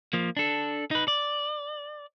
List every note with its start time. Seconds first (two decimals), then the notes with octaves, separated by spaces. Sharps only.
0.13 F3 A#3
0.37 D4 A4
0.91 D#4 B4
1.08 D5